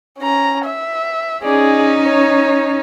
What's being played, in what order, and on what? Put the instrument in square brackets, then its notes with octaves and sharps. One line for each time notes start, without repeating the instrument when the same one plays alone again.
[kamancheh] C#4 A#5
E5
[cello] C#4 D#4 [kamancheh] G#4 D5
[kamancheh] C#5